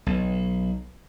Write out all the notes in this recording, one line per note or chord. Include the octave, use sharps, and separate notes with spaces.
B1